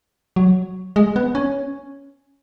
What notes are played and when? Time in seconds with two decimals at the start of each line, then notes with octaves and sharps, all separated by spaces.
0.36 F#3
0.96 G#3
1.16 B3
1.35 C#4